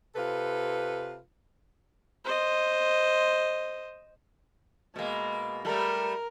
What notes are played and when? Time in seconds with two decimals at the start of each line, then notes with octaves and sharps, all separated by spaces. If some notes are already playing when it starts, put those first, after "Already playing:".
0.15 C3 F4 A4 B4
2.24 C5 D#5
4.96 B2 G#3 A#3
5.65 G3 A3 A#4